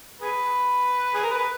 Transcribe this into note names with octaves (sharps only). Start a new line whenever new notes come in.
G#4 B4
G#4
A#4
B4